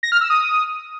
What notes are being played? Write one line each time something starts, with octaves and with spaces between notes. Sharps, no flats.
A#6
F6
E6
D#6